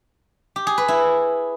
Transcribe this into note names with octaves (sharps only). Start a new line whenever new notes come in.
G4
G#4
B4
E4